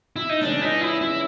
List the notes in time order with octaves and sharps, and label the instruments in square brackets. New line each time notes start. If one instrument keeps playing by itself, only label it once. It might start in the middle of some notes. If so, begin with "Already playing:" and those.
[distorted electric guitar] E4
D#4
[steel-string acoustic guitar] E2 C#3 E3 G#3 C#4 [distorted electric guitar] D4
[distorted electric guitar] D#4
E4
E4